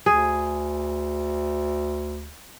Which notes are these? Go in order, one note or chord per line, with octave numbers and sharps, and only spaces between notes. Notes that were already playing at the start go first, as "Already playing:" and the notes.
D2 G#4